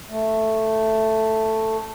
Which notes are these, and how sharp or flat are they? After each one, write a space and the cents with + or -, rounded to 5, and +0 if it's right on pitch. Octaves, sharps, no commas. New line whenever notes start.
A3 +5